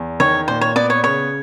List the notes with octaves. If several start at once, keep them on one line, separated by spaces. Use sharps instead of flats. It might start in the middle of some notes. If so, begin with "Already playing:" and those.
Already playing: E2
D#3 C#5
A#2 C5
C#5
B3 D5
C#5
C#3 C#5